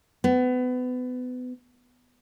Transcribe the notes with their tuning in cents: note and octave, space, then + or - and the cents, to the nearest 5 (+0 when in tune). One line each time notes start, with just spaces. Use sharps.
B3 +30